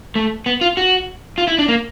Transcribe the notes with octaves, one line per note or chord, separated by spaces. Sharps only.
A3
B3
F4
F#4
F4
E4
D4
A#3